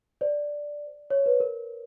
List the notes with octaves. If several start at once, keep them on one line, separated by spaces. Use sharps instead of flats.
C5 D5
C#5
B4
A#4